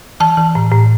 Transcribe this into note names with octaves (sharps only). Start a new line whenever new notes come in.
E3 A5
E3
A2
A2